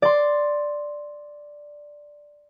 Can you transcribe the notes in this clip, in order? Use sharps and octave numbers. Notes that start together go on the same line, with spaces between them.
D5 C6